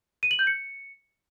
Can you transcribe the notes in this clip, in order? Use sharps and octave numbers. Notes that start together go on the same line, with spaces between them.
D#7
F#7
G6
C#7